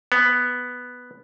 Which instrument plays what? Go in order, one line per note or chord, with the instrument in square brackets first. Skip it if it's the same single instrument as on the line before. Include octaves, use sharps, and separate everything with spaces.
[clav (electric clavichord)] B3